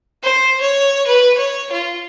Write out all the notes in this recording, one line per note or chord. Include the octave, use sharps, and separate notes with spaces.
C5
C#5
B4
C#5
F4